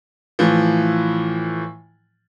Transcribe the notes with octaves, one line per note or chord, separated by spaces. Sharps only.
A2 E3 F3